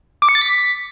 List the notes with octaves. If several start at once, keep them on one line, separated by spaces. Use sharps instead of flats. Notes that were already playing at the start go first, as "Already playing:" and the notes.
D6
C#7
A6
B6